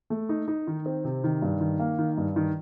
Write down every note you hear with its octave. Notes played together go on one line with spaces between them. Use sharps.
A3
D#4
D#4
D#3
C4
C3
D#3
G2
D#3
A#3
D#3
G2
D#3